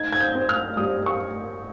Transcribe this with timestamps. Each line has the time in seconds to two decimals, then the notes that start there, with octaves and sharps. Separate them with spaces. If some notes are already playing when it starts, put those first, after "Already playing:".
Already playing: D#4 G#6
0.13 G#6
0.21 G6
0.35 C4
0.49 F6
0.77 G3 D#6
1.06 C#6